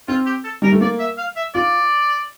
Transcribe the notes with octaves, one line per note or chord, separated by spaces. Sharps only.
C4 F4
G4
A4
G3 A#4
A3
A#3 D5
E5
F5
E5
F4 D5